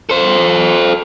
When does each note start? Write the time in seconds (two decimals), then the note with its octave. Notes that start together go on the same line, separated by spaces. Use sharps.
0.10 A4 C5